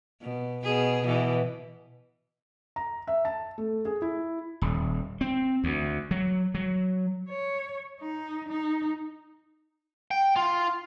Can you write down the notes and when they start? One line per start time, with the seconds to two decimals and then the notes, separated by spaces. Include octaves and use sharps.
0.22 B2
0.63 B2 G#4
1.05 B2 E3
2.76 A#5
3.07 E5
3.25 A5
3.58 A3
3.85 G#4
4.02 E4
4.62 D#1
5.21 C4
5.64 D2
6.11 F#3
6.54 F#3
7.30 C#5
8.01 D#4
8.49 D#4
10.11 G5
10.36 F4